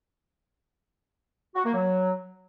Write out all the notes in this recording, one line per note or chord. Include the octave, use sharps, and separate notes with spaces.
F#4
A#3
F#3